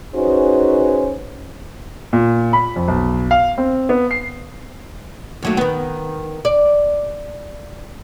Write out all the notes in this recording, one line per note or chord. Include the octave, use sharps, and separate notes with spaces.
C#4 D#4 F#4 G#4 B4 C5
A#2
B5
F2
B1
F5
C4
B3
C7
D#2 F#3 A3
D#3 B3
D5